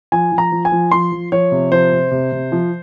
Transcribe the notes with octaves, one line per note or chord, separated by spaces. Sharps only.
F3 G#5
F3
A#5
F3
G#5
F3
F3 C6
F3
F3 C#5
C3
F3 C5
C3
C3
C3
F3